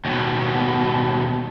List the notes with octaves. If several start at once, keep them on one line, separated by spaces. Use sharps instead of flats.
D#2 B2